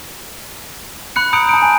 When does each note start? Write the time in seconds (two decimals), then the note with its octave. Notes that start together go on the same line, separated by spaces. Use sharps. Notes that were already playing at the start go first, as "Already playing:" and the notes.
1.16 B5 F#6 C#7
1.33 A#5 D#6 G6 C#7 D7
1.49 A5 D7
1.62 G#5